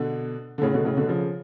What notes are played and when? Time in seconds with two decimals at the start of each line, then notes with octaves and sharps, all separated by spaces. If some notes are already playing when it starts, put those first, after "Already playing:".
Already playing: B2 D3
0.58 D3
0.62 A2 C#3
0.74 B2 D3
0.85 A2 C#3
0.97 B2 D3
1.08 C#3 F3